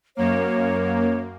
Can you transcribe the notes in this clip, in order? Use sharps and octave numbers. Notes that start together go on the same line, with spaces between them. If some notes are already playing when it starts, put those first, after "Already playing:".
F#2 A#3 C#5